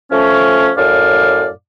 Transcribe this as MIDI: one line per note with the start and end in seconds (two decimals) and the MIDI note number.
0.11 0.71 53
0.11 0.71 57
0.11 0.71 61
0.77 1.49 42
0.77 1.49 45
0.77 1.49 74
0.77 1.49 77